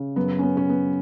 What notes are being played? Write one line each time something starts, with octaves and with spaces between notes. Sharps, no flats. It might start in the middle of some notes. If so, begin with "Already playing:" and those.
Already playing: C#3
F#2 B3
C#4
B3
C#3 C#4
B3